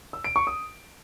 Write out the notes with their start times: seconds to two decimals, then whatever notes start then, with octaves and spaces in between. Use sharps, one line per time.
0.13 E6
0.24 D7
0.36 C#6
0.47 D#6